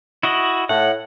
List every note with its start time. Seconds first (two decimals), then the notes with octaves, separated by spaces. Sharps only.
0.23 E4 F#4 D#5
0.69 A2 F#5